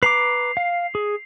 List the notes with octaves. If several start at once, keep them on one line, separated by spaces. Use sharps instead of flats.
B4 A#5 D6 C7 F7
F5
G#4